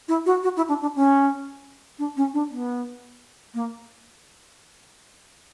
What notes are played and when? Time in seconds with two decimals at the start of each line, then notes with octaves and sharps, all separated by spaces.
0.08 E4
0.26 F#4
0.43 F#4
0.57 E4
0.69 D4
0.82 D4
0.96 C#4
1.99 D4
2.17 C#4
2.34 D4
2.50 B3
3.54 A#3